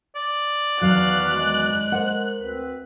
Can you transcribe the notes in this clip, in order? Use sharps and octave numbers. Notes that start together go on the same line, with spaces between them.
D5
E2 D#3 F#3 F#4 B4 F5 F#6
G#3
A#4 C5 F#5
D2 C4 B4